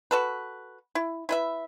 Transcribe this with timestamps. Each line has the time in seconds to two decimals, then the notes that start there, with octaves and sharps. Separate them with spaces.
0.11 F#4 A4 B4
0.95 E4
1.29 E4 B4 E5